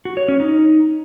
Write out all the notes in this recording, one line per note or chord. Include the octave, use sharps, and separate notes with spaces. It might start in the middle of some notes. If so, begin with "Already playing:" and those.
F#4
C#5
C#4
D#4